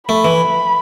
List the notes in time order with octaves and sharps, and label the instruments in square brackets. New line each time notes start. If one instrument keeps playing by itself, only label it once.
[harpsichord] A3 [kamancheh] B5
[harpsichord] E3